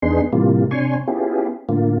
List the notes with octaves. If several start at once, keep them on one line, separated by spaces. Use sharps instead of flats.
E2 B3 D4 D#4 G#4 C6
A2 C3 E3 G3 A#3 F4
C3 D4 C#5 G#5 C6 C#6
B3 C#4 E4 F4 G4 G#4
A2 D3 A#3 F4